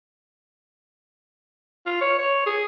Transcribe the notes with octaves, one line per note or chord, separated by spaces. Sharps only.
F4
C#5
C#5
G#4